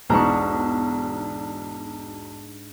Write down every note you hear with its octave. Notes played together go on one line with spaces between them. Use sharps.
B1 E2 G#2 D4 A#5 C#6